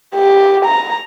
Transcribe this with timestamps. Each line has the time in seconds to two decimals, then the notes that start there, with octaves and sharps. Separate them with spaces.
0.15 G4
0.65 A#5